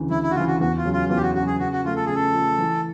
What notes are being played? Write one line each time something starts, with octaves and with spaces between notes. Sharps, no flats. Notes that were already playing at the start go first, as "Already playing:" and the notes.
Already playing: D2 C#3 E3
D2 E4
E4
F#4
C#3 E3 F4
F#4
E2 F#4
F4
C#3 F#3
F4
E2 F4
G4
F#4
C#3 F#3 F#4
G#4
C#3 F#4
F#4
F3 A3 F4
A4
C#3 G#4
A4
F3 A3
E3